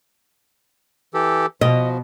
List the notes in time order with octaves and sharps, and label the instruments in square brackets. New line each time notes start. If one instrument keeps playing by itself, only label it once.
[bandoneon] E3 G4 A4
[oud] B2 [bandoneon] F3 [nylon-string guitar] D#5